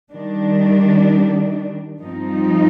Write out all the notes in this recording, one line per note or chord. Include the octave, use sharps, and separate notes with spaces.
D#3 G3 D4
G2 F3 C4 D#4